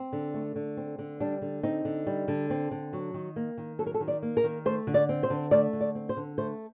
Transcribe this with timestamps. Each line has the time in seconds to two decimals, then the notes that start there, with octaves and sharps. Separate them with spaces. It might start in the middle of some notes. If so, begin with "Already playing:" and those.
Already playing: C4
0.13 D3
0.34 A3
0.56 D3
0.77 C4
0.99 D3
1.20 G3 D4
1.42 D3
1.63 C4 D#4
1.85 D3
2.07 G3
2.28 D3
2.50 C4
2.71 D3
2.93 F#3
3.14 D#3
3.36 A#3
3.58 D#3
3.79 F#3 A4
3.86 A#4
3.94 A4
4.00 D#3
4.08 D5
4.22 A#3
4.37 A#4
4.44 D#3
4.65 A3 C5
4.87 D3
4.94 D5
5.09 C4
5.23 C5
5.30 D3
5.51 A3 D5
5.73 D3
5.81 D5
5.95 C4
6.09 C5
6.17 D3
6.38 A3 C5